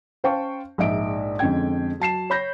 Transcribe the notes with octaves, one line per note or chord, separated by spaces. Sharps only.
C#4 C5 F5 G5 A5 C#6
A#1 G#2 D#4 D5 E5 D7
F2 D3 G#3 C#4 G5 G#6
F#3 A5 C7 E7
C#5 B5 G6 A#6